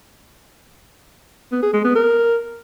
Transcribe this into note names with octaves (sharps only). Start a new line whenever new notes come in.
B3
G#4
G#3
B3
A#4